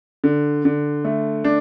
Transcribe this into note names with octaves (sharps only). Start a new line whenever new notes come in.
D3
D3
A3
D4